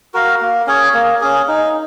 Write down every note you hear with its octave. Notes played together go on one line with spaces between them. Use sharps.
F#4 A#4 F5
A#3
C#4 G#4 C#5
A#3
C#4 G#4
D#4